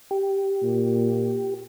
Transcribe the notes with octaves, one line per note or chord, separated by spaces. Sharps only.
G4
A#2